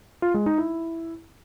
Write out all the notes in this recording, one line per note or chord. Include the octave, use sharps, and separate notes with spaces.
F4
G#3
D#4
E4